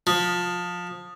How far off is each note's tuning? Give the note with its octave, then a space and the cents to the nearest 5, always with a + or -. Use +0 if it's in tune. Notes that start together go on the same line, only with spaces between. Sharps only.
F3 +20